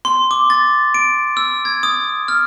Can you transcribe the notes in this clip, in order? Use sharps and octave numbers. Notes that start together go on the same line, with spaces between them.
C6
D6
A6
D7
E6
G#6
D#6
F6